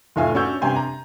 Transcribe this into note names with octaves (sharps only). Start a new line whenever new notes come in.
F1 A2 F4 E5 F5 G#5
C#4 D4 F#4 C#6 E6 G6
G2 C3 G4 G#5 C6
A#5